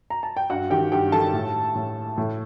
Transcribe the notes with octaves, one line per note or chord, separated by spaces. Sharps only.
A#5
A5
G5
G2 F#4 F#5
D#3 G4 G5
G2 G4 G5
D#3 A4 A5
A2
A2
A2